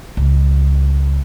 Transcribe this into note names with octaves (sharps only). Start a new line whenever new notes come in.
C#2